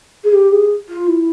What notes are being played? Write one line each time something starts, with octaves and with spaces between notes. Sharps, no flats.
G#4
G4
G#4
F4
E4